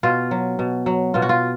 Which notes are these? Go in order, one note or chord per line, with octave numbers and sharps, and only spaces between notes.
B2 F4
F#3
B2
F#3
B2 F4
F#4
F4